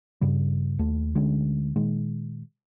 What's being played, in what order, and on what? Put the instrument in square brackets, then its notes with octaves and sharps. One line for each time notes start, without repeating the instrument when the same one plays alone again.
[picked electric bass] G2 C#3 G3
D#2 A3
D2 D3 G#3 C#4
A#2 D#3 G#3